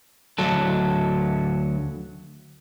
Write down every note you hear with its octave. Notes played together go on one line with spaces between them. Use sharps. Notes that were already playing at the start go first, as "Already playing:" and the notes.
D2 F#3 A4